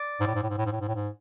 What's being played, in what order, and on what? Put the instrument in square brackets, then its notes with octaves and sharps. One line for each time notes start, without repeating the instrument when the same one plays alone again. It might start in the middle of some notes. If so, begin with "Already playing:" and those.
Already playing: [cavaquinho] D5
[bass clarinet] G#2
A2
G#2
A2
G#2
A2
G#2
A2
G#2
A2
G#2